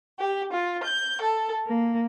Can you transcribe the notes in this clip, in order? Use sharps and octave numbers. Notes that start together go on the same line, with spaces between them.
G4
F4
G6
A4
A#3